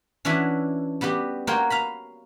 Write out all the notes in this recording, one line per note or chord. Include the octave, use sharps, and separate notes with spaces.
E3 C#4 D4 F#4 C#5 E5
G3 B3 F#4 G4
A#3 F#4 A#4 C5 C#5 G5
F5 A#5 B5